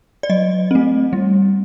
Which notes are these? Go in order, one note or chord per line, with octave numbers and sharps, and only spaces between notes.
D5
F#3 D#5
A3 C4
G3